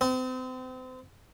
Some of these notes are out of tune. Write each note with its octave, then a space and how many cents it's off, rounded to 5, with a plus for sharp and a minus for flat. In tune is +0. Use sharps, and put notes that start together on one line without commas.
C4 -35